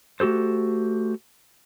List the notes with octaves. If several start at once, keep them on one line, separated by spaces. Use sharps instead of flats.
A3 F#4 G4 A4 C5